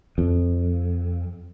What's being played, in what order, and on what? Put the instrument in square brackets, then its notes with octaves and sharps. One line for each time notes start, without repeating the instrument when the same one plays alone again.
[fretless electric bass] F2